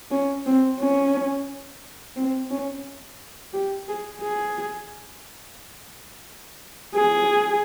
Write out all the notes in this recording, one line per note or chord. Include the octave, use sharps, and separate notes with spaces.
C#4
C4
C#4
C4
C#4
G4
G#4
G#4
G#4